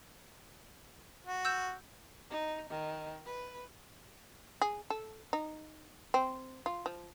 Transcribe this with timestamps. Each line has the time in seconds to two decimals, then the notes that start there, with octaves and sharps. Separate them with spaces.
1.27 F#4
1.45 E6 G6 E7
2.31 D#4
2.70 D#3
3.26 B4
4.62 G#4
4.90 A4
5.33 D#4
6.14 C4
6.66 F4
6.86 F3